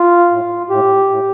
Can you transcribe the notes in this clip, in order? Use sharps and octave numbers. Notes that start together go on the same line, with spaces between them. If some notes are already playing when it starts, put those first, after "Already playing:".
Already playing: F4
A2
A2 G4
A2